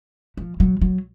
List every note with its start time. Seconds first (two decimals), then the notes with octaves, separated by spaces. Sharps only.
0.37 F3
0.60 F#3
0.81 F#3